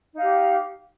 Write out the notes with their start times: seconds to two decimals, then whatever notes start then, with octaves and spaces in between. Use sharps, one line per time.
0.14 D#4
0.18 F5
0.23 G4